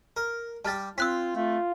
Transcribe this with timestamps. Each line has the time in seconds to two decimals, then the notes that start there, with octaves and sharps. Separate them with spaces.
0.16 A#4
0.65 G3 G4 A5 F6 A6
0.98 C4 F4 E6 F#6 B6
1.36 A3 F4